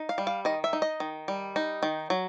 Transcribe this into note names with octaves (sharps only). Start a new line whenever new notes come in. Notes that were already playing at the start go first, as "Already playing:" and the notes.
Already playing: D#4
F5
G3
F5
D#3 D#5
E5
D#4
D#5
D#3
G3
D#4
D#3
F#3